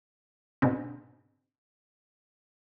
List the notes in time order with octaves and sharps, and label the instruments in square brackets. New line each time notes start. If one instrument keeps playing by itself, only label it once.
[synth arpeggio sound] G#2 B2 D3 B3 C4